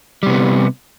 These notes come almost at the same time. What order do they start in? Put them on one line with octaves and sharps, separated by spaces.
G3 C3 B3